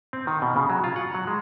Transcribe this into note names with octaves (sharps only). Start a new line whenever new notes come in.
C4
D#3
B2
C#3
F#3
F4
F#5
F#3
G#3